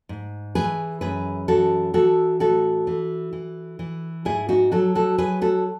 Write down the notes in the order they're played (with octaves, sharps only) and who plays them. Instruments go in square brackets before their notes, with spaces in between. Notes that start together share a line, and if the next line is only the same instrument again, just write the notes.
[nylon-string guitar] G#2
E3 G#4 B4
F#2 G#4 B4
E3 F#4 A4
E3 F#4 A4
A2 F#4 A4
E3
E3
E3
G#2 E4 G#4
D#4 F#4
F#3 F#4 A4
F#4 A4
F#3 G#4 B4
F#4 A4